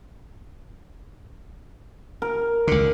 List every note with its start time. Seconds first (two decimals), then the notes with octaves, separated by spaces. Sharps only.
2.22 A#4
2.67 C#2 D3